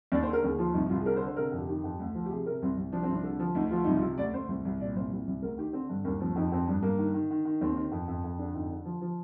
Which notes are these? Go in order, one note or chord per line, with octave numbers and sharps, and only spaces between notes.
D#2 D5
C5
D3
A#4
D#2 G#4
F3 F4
C2 D#4
C2 F4
G#4
D3 A#4
C5
D3
C5
C3 A#4
F2
G4
D#3 G4
F2
D2
F3
G4
C3 G#4
C3 A#4
C2 C4
C2
F3 D4
C4
C2
D4
D3
F3
D2 D#4
F3 F4
C2 D#4
F4
C3
D2 D5
D2 C5
C2
C2
A#2 D5
C2 C5
C2
C2
D2 A#4
D#3 G4
D3 C4
G2
D#2 A#3
F3 C4
F2 D#4
F2 C4
G2 D4
G2 A#3
D#3
D#3
D#3
D#3
D#2 C4
D#3
F2
F2
F2
D3 D4
F2 D#4
D3
F3
F3